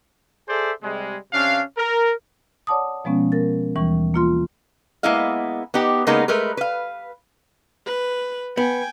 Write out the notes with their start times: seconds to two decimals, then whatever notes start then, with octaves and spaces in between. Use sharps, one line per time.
0.48 G#4 A4 C5 D5 E5
0.83 C3 G3 G#3
1.33 C3 C#4 D4 F5
1.77 A#4
2.67 C#5 D5 F#5 A5 D6 D#6
3.04 B2 F3 G#3 B3 C#4
3.32 A#4 A6
3.76 D#2 E3 G3 C#6
4.14 A#3 F4 C6
5.03 G#3 A#3 B3 E4 D#5 F5
5.74 B3 D#4 G4
6.07 C#3 G#3 A#3 B3 D#4 A#4
6.28 G#3 A3 A#4 B4
6.57 B4 F5
7.86 B4
8.57 B3 G5 G#5